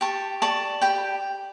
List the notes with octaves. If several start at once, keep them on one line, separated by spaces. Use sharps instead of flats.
G4 A5 C#6
D5 A5 C#6
G4 G5 B5